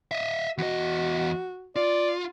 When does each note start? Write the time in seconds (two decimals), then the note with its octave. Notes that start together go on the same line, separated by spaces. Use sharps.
0.11 D#5 E5
0.58 E2 F#4 D#5
1.76 F4 D5